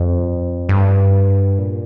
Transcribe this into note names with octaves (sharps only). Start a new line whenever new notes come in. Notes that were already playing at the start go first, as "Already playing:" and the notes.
Already playing: F2
G2
A#2